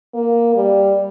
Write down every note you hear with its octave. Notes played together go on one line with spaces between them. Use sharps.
A#3
G3